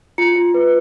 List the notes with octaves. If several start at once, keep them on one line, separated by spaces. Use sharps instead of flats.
F4 C#7
F4
B4